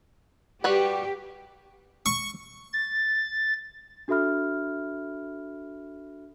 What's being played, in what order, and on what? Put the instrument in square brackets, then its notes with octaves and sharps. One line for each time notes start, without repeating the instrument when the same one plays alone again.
[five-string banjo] G3 F#4 B4 [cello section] G4
[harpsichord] C#6
[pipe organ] A6
[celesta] D4 F#4 A4 E5 B5 F6